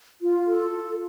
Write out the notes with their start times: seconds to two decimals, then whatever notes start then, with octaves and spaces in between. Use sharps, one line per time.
0.20 F4
0.47 A4
0.75 F4